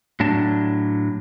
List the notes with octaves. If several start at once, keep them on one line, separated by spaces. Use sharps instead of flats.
A2 F#3 D4 A5